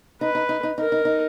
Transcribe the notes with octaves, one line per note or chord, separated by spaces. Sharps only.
D#4 B4
D#4
D#4
D#4
D#4
A#4
D#4
D#4